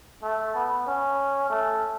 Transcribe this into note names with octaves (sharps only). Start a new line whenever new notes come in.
A3
B3
C#4
A3